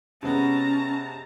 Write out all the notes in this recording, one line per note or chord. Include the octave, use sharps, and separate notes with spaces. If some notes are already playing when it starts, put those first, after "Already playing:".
C3 G#3 B3 C#4 A5 A#5